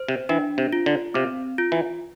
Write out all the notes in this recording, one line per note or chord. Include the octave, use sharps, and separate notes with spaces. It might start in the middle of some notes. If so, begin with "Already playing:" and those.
Already playing: C5
C3
E3 D4
C3
F4
D3
C3 C4
F4
E3